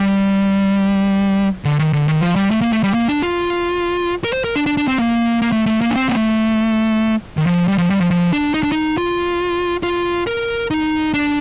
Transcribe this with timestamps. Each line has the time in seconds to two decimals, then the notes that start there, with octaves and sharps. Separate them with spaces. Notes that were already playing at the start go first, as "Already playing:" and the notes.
Already playing: G3
1.65 D3
1.79 D#3
1.93 D3
2.08 D#3
2.21 F3
2.36 G3
2.51 A3
2.61 A#3
2.73 A3
2.83 G3
2.94 A#3
3.08 D4
3.22 F4
4.24 A#4
4.33 C5
4.44 A#4
4.56 D4
4.66 D4
4.77 D4
4.88 C4
4.98 A#3
5.42 A#3
5.52 A3
5.66 A3
5.81 A#3
5.90 D4
5.96 C4
6.09 A#3
6.17 A3
7.37 D#3
7.47 F3
7.68 G3
7.78 F3
7.90 G3
8.00 F3
8.11 F3
8.33 D4
8.54 D#4
8.63 D4
8.72 D#4
8.98 F4
9.83 F4
10.27 A#4
10.71 D#4
11.14 D4